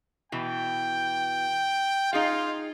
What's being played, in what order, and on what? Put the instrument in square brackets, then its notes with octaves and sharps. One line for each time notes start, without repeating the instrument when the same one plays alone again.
[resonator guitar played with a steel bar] B2 E3 [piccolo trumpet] G5
[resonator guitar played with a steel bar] D#4 G#4 F5 [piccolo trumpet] F4